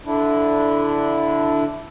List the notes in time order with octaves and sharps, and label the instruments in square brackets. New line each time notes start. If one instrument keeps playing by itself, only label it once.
[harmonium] D3 D4 E4